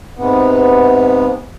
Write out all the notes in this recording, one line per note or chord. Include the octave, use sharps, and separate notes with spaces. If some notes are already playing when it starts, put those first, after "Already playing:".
G#2 C3 B3